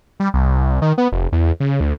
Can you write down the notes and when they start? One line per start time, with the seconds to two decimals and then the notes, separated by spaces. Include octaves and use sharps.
0.20 G3
0.34 C2
0.82 D#3
0.98 B3
1.12 F1
1.32 E2
1.60 C#3
1.80 D2